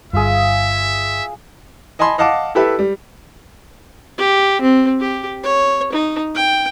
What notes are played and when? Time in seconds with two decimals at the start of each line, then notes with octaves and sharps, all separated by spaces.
0.13 G1 G2 F4 G#4 E5
1.99 D#5 G#5 A5 B5 C6
2.18 D#5 F5 F#5 A5 D6
2.55 E4 G4 A4 B4 E5
2.79 G3
4.18 G4
4.61 C4
5.00 G4
5.43 C#5
5.93 D#4
6.35 G5